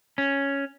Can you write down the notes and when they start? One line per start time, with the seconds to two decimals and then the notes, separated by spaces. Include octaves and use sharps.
0.18 C#4